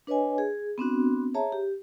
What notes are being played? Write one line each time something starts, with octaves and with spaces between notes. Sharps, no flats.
D4 B4 C#5 D#5 G#5
G#4
B3 C4 D4 F#4
G#4 C#5 E5 A5 A#5
G4